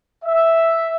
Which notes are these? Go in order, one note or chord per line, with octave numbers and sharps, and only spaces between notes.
E5